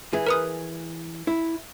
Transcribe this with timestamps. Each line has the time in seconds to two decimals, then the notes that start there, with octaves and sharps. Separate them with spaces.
0.13 E3 G#4
0.27 A#4 B4 D#6
1.27 E4